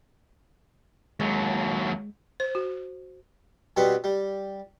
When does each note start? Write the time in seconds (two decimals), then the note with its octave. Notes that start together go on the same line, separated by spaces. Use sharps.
1.20 D#2 F#3 G#3
2.40 C5
2.55 F#4
3.77 B2 G3 B3 C4 B4
4.04 G3